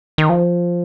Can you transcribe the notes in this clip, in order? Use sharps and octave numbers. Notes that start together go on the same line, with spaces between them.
D#3
F3